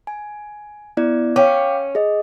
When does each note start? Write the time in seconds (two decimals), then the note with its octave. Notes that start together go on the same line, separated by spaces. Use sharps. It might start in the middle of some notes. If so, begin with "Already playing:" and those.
0.07 G#5
0.97 B3 E4 D5
1.36 C#4 F5 G5 D6
1.95 G#4 D#5